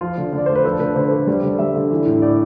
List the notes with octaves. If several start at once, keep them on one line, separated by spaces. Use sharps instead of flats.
F3 F4
D3
D3
D5
A3 C5
B4
F3 A4
D3 B4
D3 C5
A3
G3
D3
G3 E5
D3
E3
A2
A2 D5